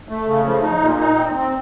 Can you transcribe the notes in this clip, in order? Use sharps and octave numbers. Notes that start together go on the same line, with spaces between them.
A3
C#3
F3
D#4
A#2
D#4
C4
C4